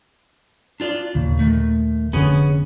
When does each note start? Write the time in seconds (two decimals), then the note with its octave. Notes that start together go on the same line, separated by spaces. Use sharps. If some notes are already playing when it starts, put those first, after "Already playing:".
0.80 D4 F4 D5
1.15 D#2 A#2 C#3
1.39 D#3 A3
2.13 F1 D3 B3 C#4 G#4